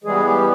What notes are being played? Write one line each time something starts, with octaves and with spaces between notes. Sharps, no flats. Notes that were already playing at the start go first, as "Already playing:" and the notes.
E3 G3 G#3 B3 G#4
G3 G4